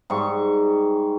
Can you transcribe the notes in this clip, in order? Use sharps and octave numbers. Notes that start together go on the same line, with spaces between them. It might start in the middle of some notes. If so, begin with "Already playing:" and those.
G#2 G3 C#6